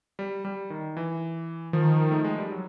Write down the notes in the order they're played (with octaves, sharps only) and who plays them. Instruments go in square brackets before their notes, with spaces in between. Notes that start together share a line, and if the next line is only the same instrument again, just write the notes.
[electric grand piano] G3
G3
D#3
E3
[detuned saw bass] D#3 [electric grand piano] F3
[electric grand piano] A3
G#3
G3
F#3